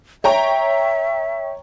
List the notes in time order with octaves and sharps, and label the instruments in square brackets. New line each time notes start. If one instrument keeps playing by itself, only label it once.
[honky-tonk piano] C#5 G5 A#5 [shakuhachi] E5